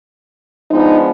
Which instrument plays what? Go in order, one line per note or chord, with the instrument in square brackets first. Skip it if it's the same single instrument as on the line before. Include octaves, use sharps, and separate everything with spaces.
[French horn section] F3 G#3 B3 D4 D#4